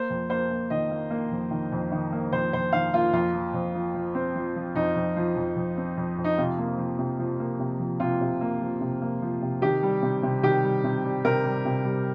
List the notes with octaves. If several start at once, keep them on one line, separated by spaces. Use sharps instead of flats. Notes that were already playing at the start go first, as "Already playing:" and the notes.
Already playing: A#3 C5
F2
A#3 C5
A#3
D#3 D#5
A#3
A#3
F2
D#3
F2
D#3
A#3
F2 C5
F2 C5
D#3 F5
A#3 F4
F2 F4
F3
F2
F3
F3
C4
F3
F3
F2 D#4
F2
F3
F2
F2
C4
F2
F2
D#4
C3 F4
A#3
F3
C3
F3
A#3
C3
F3
C3 F4
C3
A#3
F3
C3
A#3
F3
C3
D#3 G4
G3
C3
C3
D#3 G4
G3
C3
G3
C3 A#4
G3
C3
G3